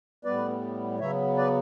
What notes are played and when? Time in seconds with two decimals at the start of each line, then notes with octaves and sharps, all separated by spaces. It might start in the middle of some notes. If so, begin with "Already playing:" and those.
0.24 A2 G3 B3 B4 D5
0.99 C#3 F#3 B3 C#5 E5
1.37 B4 D5